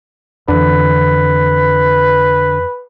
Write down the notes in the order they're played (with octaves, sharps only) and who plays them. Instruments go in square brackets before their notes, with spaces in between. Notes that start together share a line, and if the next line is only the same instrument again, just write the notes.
[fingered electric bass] F2 E3 [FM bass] D3 [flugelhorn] B4